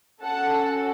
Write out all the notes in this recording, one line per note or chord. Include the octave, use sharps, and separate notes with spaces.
C#4 F#4 A4 F#5 A5